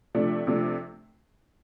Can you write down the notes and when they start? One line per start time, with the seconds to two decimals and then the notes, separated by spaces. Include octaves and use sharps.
0.15 C3 F3 A3 D4
0.47 C3 F3 A3 D4